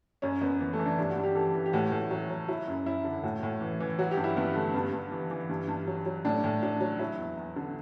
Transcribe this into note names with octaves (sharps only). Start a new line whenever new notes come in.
F#2 C#4
F#2 B3
E3 B3
A3
E3
D4
G2 D4
F#4
G2
G4
E3 A4
E3
G4
A2 F#4
A2
F#3
F#3
F#3 E4
F#2
F#2 E4
D3
A2 F#4
A2
E3
E3
F#3 F#4
G4
G2
E4
G2 B3
D3 A3
G2 B3
G2
E3
E3
G2
G2
F#3
F#3
A2 D4
A2
F#3 D4
F#3
F#3 E4
E2
E2
D3